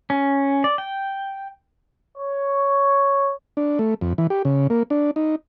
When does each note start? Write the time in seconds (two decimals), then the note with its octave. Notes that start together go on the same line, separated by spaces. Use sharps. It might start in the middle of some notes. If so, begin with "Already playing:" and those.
0.10 C#4
0.64 D5
0.78 G5
2.18 C#5
3.57 D4
3.79 A3
4.01 F2
4.18 E3
4.30 G4
4.45 C#3
4.70 A#3
4.90 D4
5.16 D#4